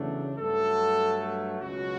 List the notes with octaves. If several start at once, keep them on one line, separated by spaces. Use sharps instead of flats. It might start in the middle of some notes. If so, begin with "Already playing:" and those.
Already playing: E2 C#3 F#3 A3 D4
G2 F#3 A3 A4
C#2 B2 F#3 C#4 F#4